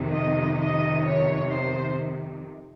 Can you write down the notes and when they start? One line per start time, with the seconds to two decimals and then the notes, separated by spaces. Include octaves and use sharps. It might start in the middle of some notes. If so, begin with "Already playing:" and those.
Already playing: F2 C3 D#3
0.12 D#5
0.58 D#5
1.04 C#5
1.50 C5